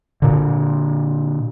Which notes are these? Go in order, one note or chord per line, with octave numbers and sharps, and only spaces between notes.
A#2 D3